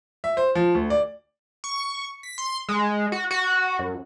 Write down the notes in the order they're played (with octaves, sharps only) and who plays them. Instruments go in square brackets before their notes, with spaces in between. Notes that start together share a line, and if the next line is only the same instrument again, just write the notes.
[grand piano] E5
C5
F3
D2
D5
[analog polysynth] C#6
B6
C6
G#3
F#4
F#4
F#2